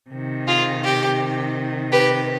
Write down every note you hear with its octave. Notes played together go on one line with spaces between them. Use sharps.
C3 D#3
F4 G#4
G4
G4 B4